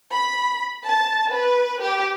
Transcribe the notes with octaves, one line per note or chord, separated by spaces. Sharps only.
B5
A5
B4
G4